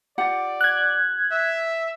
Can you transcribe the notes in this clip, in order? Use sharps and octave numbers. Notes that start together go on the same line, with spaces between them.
F4 G4 D5 F#5
F#6 G#6
E5